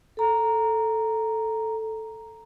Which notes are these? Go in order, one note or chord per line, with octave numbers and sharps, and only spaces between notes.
A4 A#5